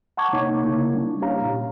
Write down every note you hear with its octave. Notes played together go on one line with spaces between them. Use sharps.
F#5 A5 A#5 C#6 D6 G#6
C3 A#3 D#4 C#5
C#3 A#3 E4
G3 C#4 D4
C#4 G4 C#5 F5 A#5
A#2